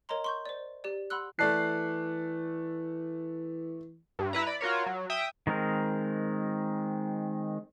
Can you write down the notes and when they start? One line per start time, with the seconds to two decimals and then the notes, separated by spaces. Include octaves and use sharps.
0.09 A#4 C#5 D#5 A#5 C6
0.24 C6 C#6 G6
0.46 C5 D5
0.84 G4 D5
1.10 F#5 B5 C6 E6 F#6
1.39 E3 A3 D5 A5 F#6 C7
4.19 G2
4.33 E4 B4 A#5
4.46 D5 B5
4.61 F4 F#4 A#4 C#5
4.86 F#3
5.10 E5 G5 D#6
5.47 D#3 G#3 C4 A#4